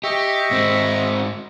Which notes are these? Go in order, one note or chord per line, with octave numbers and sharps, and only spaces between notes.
G4 D#5 E5 C#6
G#2 C4